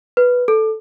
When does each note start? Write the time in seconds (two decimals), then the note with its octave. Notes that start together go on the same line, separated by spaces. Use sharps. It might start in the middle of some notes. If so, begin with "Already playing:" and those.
0.17 B4
0.48 A4